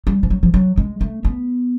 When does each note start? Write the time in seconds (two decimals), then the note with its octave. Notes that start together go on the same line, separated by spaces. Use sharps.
0.07 G3
0.23 F3
0.30 F#3
0.43 F3
0.54 F#3
0.78 G#3
1.01 A3
1.25 B3